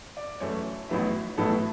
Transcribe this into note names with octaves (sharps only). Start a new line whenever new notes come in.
D5
F#2 E3 A3 C#5
A1 A2 F#3 B3 E4
A1 A2 F#3 B3 E4 A4